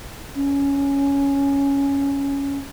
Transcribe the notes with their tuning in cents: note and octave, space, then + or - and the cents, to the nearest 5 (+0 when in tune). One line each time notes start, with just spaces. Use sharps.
C#4 +5